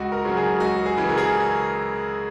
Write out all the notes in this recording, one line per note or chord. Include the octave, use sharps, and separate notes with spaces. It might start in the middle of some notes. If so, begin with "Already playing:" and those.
Already playing: C#2 F#4
A#4
C#3 F#3
G#4
C#2 F#4
G#4
C#3 E3
A#4
G#4